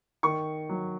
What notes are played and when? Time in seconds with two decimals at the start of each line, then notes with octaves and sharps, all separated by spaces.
0.23 D#3 C#6
0.69 F#3